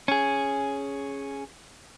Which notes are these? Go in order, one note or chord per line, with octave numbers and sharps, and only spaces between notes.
C#4 G#4